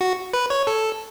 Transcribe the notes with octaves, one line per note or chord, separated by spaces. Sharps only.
F#4
B4
C#5
A4